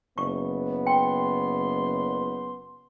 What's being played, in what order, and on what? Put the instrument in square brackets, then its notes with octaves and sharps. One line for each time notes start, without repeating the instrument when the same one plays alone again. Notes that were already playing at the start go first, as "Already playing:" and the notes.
[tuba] F#1 [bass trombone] B3 [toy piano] C#6
[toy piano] G5 [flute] C6